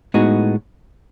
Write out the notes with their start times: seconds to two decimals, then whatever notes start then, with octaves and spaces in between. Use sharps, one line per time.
0.14 A2 G#3 B3 D#4 F#4